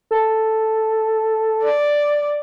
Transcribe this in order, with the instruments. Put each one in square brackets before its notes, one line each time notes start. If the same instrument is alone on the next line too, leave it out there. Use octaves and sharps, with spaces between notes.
[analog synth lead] A4
[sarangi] D5